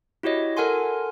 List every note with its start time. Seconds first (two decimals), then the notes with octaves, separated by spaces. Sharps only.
0.23 E4 F#4 G4 C#5 D#5
0.57 A4 A#4 F#5 G#5 C6